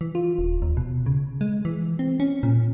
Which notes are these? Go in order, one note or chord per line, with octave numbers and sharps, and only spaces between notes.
E3
F4
D#1
D#2
B2
C#3
G#3
E3
C4
C#4
A#2